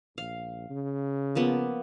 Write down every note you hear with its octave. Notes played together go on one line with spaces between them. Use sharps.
A#1 F5
C#3
F3 A#3 B3